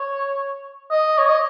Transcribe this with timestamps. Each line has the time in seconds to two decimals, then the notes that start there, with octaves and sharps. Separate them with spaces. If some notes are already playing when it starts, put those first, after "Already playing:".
Already playing: C#5
0.91 D#5
1.18 C#5
1.28 D#5